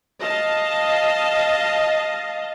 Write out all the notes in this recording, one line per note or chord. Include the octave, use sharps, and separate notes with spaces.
D#5 F5 A5